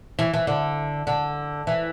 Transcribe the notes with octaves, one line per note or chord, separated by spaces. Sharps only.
E3
E3
D3
D3
E3